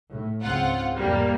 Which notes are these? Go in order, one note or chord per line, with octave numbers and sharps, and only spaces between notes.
A2
C#2 G#2 C4 F4 F#5
F2 A2 G3 A#3